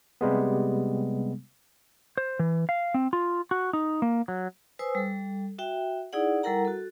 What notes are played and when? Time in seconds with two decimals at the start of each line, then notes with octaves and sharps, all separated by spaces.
0.21 C3 G3 G#3 B3
2.17 C5
2.39 E3
2.69 F5
2.94 C4
3.13 F4
3.51 F#4
3.73 D#4
4.02 A#3
4.28 F#3
4.79 B4 C5 G#5 D#6 E6
4.95 G3 A4
5.59 F#4 E5 G5
6.13 D#4 E4 G#4 D5 F#5
6.43 G3 E4 A4 A#4 F#5 A#5
6.65 F#4 A4